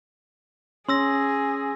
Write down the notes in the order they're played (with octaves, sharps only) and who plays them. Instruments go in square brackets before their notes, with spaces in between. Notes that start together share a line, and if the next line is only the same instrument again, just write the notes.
[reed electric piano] C#4 [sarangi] G#4 [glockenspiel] C6 E6 A#6